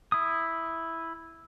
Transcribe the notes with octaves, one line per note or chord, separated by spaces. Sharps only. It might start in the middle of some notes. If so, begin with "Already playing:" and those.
E4 D#6